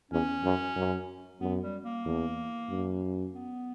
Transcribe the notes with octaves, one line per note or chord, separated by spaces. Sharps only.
E2 C#4
F#2
F#2
F#2 B3
G3
A#3
E2
F#2
B3